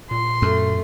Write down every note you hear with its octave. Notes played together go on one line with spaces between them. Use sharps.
A#2 C6
F#2 A3